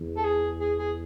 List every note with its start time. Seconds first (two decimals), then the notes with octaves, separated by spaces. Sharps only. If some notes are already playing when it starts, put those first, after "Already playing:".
Already playing: E2
0.17 A4
0.24 G#4
0.60 G#4
0.78 G#4